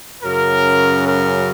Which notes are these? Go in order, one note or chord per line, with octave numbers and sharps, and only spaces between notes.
F#2 C#3 F#3 A#4
A#4